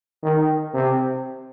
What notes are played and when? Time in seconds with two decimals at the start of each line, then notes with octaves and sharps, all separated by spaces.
0.23 D#3
0.74 C3